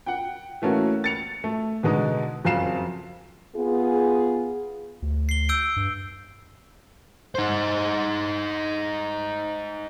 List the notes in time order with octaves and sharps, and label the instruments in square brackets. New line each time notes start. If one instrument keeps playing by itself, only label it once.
[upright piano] F#5 G5
E3 A3 A#3 C#4 F#4
A6 C#7 F7
A3
B2 D3 G#3 D#4
F#1 F2 F#3 F5 C7 E7
[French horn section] B3 F4 G#4
[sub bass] D2
[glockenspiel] C7 G7
E6 G6 D7
[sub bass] G2
[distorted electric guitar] D#4 C5